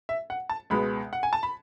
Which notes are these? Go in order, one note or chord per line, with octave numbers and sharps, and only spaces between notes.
E5
F#5
A5
C#2 B2 G#3 B3 B5
F#5
G#5
A5
B5